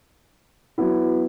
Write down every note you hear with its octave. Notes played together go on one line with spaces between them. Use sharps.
F#3 B3 E4